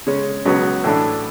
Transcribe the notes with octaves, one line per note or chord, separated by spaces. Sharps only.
C#3 G#3 C#4
C#2 C#3 F#3 B3 F#4
A2 E3 A3 D4